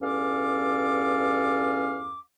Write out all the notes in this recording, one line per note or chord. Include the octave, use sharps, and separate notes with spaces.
E2 G2 C#4 A4 F5 D6